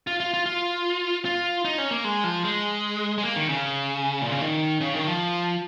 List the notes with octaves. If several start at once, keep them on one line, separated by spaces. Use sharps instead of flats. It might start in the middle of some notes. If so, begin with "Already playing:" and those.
F4
F4
F4
F4
F4
D#4
C#4
A#3
G#3
F3
G#3
G#3
A#3
D#3
C#3
A#2
C#3
D#3
C#3
D#3
F3